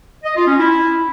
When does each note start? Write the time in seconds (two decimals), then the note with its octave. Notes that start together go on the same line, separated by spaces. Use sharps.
0.24 D#5
0.36 F4
0.47 C#4
0.59 E4